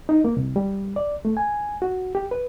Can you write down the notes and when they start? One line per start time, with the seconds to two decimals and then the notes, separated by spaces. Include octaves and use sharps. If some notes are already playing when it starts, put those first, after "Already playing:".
0.09 D#4
0.24 A#3
0.37 C2
0.56 G3
0.96 D5
1.25 A3
1.37 G#5
1.82 F#4
2.15 G4
2.31 B4